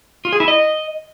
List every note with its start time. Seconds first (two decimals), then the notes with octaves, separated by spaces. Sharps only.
0.25 F4
0.33 G#4
0.40 E4
0.48 D#5